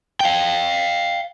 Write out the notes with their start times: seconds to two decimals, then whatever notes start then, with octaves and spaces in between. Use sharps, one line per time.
0.20 F5 G5